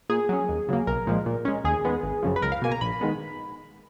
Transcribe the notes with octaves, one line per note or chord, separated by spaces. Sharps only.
A#2 G#4
F#3 C#4
D#2
C#3 F#3 A#3
B1 A#4
A#2 F3 G#3
A#2
G#3 C#4
D#2 G#4
D#3 G#3 B3
G#1
F#2 C#3 F3
B4
C#2 A#4
F5
B2 A#3 G#5
A#5
A#1 B5
D#3 G#3 B3